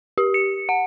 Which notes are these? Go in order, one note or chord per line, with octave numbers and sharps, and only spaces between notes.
G4
C#7
F#5